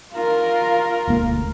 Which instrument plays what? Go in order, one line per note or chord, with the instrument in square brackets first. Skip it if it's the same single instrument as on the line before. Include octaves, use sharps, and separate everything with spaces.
[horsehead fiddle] F4 A#4
[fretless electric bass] E1 D2 A#3